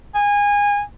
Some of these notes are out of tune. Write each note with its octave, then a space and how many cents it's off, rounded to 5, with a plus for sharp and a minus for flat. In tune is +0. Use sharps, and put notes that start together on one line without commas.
G#5 -25